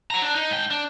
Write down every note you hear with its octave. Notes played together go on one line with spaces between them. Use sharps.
F#4 A#5
D4
D#4
G#2 G5
D4